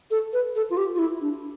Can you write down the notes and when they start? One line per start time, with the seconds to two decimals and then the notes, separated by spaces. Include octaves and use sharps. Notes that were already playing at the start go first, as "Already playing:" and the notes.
0.11 A4
0.33 B4
0.55 A4
0.70 F4
0.77 G4
0.95 F4
0.99 E4
1.21 D4